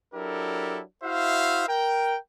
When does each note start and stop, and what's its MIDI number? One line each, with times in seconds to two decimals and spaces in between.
0.14 0.81 54
0.14 0.81 62
0.14 0.81 64
0.14 0.81 67
0.14 0.81 69
0.14 0.81 70
1.03 1.68 64
1.03 1.68 66
1.03 1.68 72
1.03 1.68 76
1.03 1.68 77
1.68 2.17 70
1.68 2.17 79